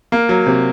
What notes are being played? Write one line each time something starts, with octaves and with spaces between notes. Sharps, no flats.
A#3
F#3
C3